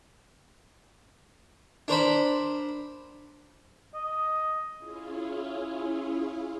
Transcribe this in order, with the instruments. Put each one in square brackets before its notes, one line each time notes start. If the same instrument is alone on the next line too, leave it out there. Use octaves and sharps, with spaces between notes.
[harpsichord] D4 A#4 C5 B5
[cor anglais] D#5
[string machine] C#4 E4 F4 G#4